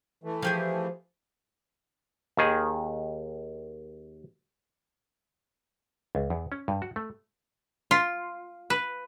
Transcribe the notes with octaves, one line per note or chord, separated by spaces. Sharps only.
E3 A3
F3 G4 G#4
D#2 D#3 G#4
C#2
E2
C#4
G2
F#4
A3
F4
B4